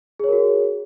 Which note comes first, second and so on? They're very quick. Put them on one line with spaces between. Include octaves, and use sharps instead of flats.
G#4 C#5 A#4 F#4